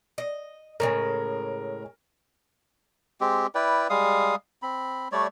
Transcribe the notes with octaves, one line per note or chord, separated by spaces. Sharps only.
D#5
A2 C#3 G#3 A#4
G#3 C4 G4
E4 B4 D5 G5
G3 G#3 F5 D#6
C4 B5
G3 A3 C#5 D5